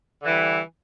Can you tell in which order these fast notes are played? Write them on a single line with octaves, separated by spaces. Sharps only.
D3 E3 G3